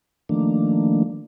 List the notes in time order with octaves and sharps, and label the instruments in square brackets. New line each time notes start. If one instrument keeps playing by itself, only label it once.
[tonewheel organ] D#3 F3 A3 A#3 D4